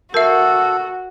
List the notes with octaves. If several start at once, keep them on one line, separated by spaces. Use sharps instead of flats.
F#4 A4 A#4 E5